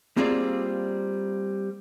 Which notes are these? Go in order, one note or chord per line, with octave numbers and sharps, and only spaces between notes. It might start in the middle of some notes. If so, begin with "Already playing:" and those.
G3 A#3 C4 F4 G#4 D5